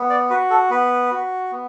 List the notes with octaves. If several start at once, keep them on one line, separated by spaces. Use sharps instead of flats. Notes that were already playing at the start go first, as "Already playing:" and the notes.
Already playing: B3
D5
F#4 B4
A4
B3 B4
F#4
B3